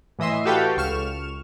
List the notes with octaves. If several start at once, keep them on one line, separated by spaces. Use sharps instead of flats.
A2 E3 D#5 E5 C6
F#4 G4 A4 B4 F5 G5
C#2 C#6 F6 E7